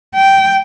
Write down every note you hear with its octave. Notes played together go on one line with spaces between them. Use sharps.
G5